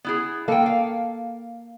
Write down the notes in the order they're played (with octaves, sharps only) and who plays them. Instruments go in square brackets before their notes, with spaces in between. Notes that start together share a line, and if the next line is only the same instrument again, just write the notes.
[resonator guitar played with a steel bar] B3 E4 G#4
[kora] A#3 A4 [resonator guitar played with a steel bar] F5 G5
[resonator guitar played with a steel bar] F5